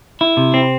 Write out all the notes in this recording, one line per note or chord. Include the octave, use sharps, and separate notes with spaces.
E4
C3
C4